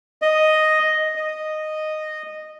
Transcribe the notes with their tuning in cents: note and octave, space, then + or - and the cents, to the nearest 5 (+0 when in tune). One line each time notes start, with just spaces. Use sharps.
D#5 +0
D#5 -10